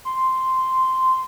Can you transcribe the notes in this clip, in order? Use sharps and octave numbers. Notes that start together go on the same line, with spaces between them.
C6